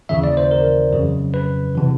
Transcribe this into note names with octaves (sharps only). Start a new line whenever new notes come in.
D#2 C#3 E3 E5
D5
C5
A#4
F2 C#3 F#3
B4
C3 E3